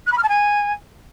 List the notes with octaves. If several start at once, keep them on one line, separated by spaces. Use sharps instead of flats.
F#6
B5
F6
A5
G#5